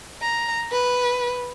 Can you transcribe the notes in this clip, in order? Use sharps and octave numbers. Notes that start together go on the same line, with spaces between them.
A#5
B4